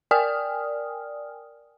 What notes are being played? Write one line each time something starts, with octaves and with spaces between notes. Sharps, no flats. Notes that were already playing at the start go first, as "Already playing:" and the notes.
A#4 D5 G5 G#5 D#6 F6